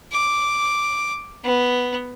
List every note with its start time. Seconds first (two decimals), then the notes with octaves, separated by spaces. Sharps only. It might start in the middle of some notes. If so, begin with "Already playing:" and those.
0.12 D6
1.44 B3